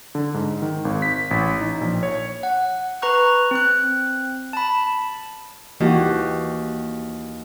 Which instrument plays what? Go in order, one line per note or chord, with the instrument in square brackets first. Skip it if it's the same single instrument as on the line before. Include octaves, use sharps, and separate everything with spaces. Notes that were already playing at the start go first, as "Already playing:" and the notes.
[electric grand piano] D3
G#2
D#3
G#1
B6
A1
D#4
A#1
C#5
[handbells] F#5
B4 A#5 C#6 F#6
C4 F#6
A5 B5
[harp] D#2 [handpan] E3 F#4 G4